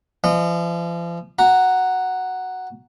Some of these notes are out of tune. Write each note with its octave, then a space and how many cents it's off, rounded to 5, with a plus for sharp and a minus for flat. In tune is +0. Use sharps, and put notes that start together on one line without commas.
F3 -40 D#5 -35
F#4 +0 A#5 +0